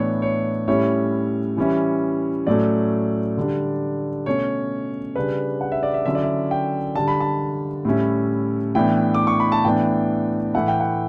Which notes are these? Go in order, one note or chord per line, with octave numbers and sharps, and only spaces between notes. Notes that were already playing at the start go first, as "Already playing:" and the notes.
Already playing: A2 E3 B3 D4 C#5
C#5
A2 G3 C#4 E4 C#5
E3 G3 C#4 E4
A2 F#3 A3 C#4 D5
D3 G3 D4
B2 A3 C#4 C#5
C#3 G3 D4 B4
F#5
E5
D5
E5
D3 F#3 C#4 E4 E5
D5
E5
G5
D3 G3 D4 A5
B5
A5
A2 G3 C#4 E4
A2 E3 B3 D4 G5
D6
C#6
B5
A5
A2 E3 B3 D4 G5
A2 E3 A3 E4 F#5
G5
F#5